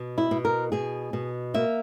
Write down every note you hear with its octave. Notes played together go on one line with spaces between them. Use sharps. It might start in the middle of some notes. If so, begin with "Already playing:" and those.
Already playing: B2
E4
B2
A#4
B2 G#4
B2
A#3 E5